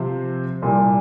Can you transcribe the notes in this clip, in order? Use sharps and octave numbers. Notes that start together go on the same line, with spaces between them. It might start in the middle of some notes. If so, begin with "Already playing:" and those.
Already playing: C3 F3 C4 F4 C5
C2 A#2 G3